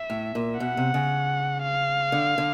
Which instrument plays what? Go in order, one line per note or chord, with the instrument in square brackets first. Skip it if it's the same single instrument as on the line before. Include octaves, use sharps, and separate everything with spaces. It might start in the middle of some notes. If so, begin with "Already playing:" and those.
Already playing: [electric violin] E5
[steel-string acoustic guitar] A2
A#2
[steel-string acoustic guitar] B2 [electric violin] F#5
[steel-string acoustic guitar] C3
C#3
[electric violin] F5
[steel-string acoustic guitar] D3
D3